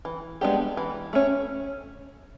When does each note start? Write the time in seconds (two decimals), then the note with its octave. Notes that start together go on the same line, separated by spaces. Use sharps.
0.05 E3
0.41 G#3 B3 D4 G4
0.77 E3
1.13 A3 C#4